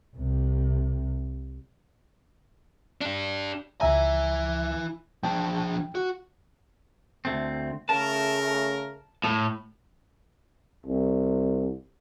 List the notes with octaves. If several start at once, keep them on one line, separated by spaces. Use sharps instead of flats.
C2 C3
D4 G4
C#2 E4 E5 G#5 A#5
F3 D4 G5
F#4
D2 A3 C4
C#3 A3 A#4 A5
A2
C2